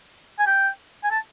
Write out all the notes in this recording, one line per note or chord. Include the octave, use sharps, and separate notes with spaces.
G#5
G5
G#5
A5